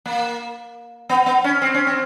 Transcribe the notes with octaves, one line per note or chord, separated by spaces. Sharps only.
A#3
B3
B3
C#4
C4
C#4
C4